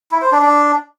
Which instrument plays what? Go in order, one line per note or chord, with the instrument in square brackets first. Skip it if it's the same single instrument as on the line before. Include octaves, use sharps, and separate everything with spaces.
[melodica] E4
C5
D4
D4